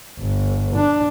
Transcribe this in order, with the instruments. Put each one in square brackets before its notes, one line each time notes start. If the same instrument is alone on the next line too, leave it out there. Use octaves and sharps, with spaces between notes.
[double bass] G1
D4